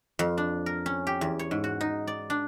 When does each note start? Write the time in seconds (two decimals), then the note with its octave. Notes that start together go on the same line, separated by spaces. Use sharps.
0.19 F2
0.38 D4
0.66 A#4
0.86 C#4
1.07 G4
1.21 E2
1.39 C#5
1.51 G#2
1.64 F#4
1.81 D#4
2.07 D5
2.30 D4